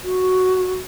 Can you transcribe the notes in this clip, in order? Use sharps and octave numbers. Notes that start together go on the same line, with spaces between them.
F#4